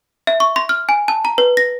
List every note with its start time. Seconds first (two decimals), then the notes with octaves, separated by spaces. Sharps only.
0.27 E5
0.40 C#6
0.56 C6
0.69 F6
0.89 G#5
1.08 A5
1.25 A#5
1.38 B4
1.57 A#6